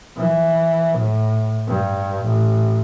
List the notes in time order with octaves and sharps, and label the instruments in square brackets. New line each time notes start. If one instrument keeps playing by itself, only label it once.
[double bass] E3
A2
G2
A1